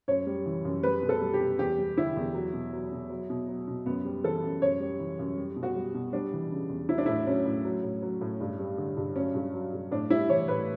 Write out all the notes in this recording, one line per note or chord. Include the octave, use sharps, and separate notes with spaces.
F#2 C#5
G3
E3
F#2
G3 B4
B2
A4
G3
G4
B2
E2 G4
G3
D3 E4
E2
F#3
B2
F#3
B2
F#3
B2
F#3
B2
F#2 B3
G3
E3 A4
F#2
F#2 C#5
G3
E3
F#2
G3
B2
F#4
G3
B2
G3 D4
E3
C#3
E2
F#3 E4
D4
A2 E4
F#3 C#4
A2
F#3
A2
F#3
A2
G2
G3
D3
G2
F#3 C#4
G2
F#3
G2
A2 D4
G3 E4
E3 C#5
A2 B4